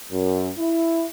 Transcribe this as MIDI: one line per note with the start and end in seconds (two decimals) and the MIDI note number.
0.12 0.49 42
0.59 1.06 64